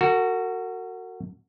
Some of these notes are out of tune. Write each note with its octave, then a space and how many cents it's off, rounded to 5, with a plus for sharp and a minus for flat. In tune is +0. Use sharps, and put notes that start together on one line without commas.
F#4 +0 A#4 -45